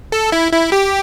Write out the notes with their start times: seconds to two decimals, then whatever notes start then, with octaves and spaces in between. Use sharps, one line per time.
0.12 A4
0.32 E4
0.53 E4
0.72 G4